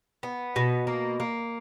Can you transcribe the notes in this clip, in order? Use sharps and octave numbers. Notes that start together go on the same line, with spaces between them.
B3
B2
A#3
A#3